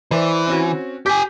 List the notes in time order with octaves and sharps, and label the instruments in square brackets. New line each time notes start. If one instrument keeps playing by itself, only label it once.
[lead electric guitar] E3 [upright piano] C5 D5 E5
[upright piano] C4 C#4 F#4
[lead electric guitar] G4 G#5 [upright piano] D6 G6 B6